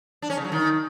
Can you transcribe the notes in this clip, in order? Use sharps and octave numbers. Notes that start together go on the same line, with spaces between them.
D4
C#4
C#3
F#3
D#3